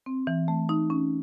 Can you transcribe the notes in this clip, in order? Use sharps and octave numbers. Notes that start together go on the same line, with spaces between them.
C4
E3
A3
D#4
C#4